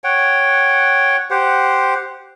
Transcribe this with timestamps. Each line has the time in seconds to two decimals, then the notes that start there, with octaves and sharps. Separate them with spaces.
0.04 C#5 F#5 G5
1.30 G4 C5 F#5